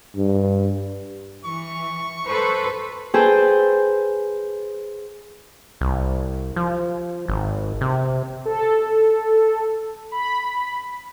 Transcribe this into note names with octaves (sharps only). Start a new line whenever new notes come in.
G2
E3 C#6
A4 B4 C5
G#4 A4 B4 C5 G5
C2
F3
G#1
C3
A4
B5